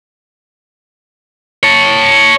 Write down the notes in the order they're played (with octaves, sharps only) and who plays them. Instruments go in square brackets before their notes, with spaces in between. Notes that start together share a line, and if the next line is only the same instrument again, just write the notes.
[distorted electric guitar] C#5 A5